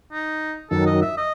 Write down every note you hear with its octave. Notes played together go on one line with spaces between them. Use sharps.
D#4
F#2 D#3 F#3 A4
D#5
E5
D#5